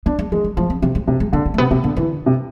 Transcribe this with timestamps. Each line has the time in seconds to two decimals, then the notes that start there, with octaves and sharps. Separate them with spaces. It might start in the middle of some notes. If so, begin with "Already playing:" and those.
0.06 B3 D4
0.19 G#3
0.32 E3 G#3
0.44 G#3
0.57 F3 A3
0.70 C4
0.82 C3 E3
0.95 G#3
1.08 C3 A3
1.20 G#3
1.33 D3 B3
1.46 C4
1.54 A3
1.58 C3 B3
1.71 C3 B3
1.84 D3 B3
1.97 D3 E3
2.26 C3